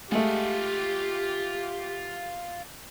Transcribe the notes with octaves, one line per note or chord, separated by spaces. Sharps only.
G#3 A3 F4 G4 F#5